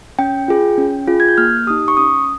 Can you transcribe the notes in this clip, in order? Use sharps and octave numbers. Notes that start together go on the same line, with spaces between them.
C#4 G5
F4 G#4
C#4
F4 G#4
G#6
G6
A#3 F6
D#4 G4 D#6
C#6
C#4 D#6